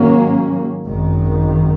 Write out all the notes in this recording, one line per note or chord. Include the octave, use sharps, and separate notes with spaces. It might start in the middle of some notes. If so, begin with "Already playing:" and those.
Already playing: G#2 D#3 F#3 A#3 C#4
G#1 F#2 D#3